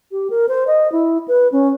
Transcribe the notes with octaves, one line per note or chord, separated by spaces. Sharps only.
G4
A#4
C5
D#5
E4
B4
C#4